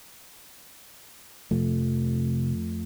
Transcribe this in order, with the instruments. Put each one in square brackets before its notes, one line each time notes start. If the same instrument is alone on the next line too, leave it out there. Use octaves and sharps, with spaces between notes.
[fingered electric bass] F2 F3 A3 [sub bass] C3